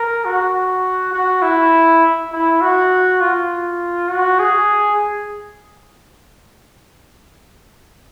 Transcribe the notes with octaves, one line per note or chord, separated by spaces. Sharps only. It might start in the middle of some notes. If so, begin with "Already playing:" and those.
Already playing: A#4
F#4
F#4
E4
E4
F#4
F4
F#4
G#4